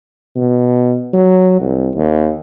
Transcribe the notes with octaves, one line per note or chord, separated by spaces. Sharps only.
B2
F#3
C2
D#2